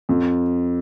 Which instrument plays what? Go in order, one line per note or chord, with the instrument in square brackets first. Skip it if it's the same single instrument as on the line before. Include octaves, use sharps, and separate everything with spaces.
[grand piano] F2